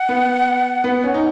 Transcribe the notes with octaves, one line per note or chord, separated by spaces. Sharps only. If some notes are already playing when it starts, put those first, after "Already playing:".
Already playing: F#5
B3
B3
C#4
D#4